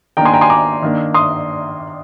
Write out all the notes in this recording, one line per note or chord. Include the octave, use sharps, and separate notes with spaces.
D#3 A#3 D4 G5 A#5
G#5 C6
G5 A#5
G#5 C6
A#5 D6
D#3 A#3 D4
C6 D#6